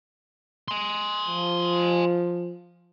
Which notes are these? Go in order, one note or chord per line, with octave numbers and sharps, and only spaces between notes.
G#5 C6
F3